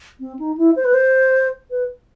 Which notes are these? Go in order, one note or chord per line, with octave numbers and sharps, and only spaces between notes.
C4
D#4
E4
C5
B4
C5
B4